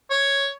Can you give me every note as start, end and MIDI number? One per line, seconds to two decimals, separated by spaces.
0.10 0.49 73